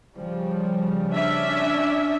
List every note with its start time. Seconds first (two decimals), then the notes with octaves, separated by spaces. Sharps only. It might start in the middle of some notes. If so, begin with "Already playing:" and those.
0.16 C#3 F3 G3
1.10 C#4 D4 E5